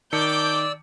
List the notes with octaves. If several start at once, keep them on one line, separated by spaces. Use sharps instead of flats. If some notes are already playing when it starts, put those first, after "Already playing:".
D#3 D5 A5 D6 E6 G6 C#7